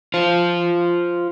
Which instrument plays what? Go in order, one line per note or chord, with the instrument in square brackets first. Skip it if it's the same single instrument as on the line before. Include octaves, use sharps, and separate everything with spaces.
[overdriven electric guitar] F4 C5